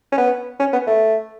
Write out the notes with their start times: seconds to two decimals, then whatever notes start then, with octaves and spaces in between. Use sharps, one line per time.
0.12 C#4
0.18 B3
0.60 C#4
0.72 B3
0.87 A3